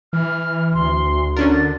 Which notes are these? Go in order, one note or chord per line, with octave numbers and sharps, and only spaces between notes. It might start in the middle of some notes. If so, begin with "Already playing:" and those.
E3 F6
D2 C6
D3 C#4 D4 A#4 A6